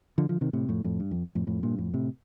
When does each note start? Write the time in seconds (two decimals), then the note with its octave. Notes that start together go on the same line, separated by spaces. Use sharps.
0.18 D3 F3
0.29 D3 F3
0.41 C3 D#3
0.53 A2 C3
0.69 F2 A2
0.84 F2 A2
1.00 G2
1.11 F2
1.35 F2 A2
1.47 F2 A2
1.63 G2 A#2
1.78 F2 A2
1.94 A2 C3